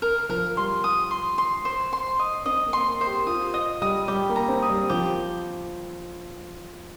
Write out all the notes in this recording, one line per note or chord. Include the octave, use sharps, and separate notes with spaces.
A#4
F3 A#4
G3 C6
D#6
C6
C6
C5
C6
D#5
C4 D#5
A#3
C6
A#4
A#4 C5
G4
F4 D#6
D#5
G3 D#5
G3 G4
A#3
A#5
C4
D#6
G3
F3 G4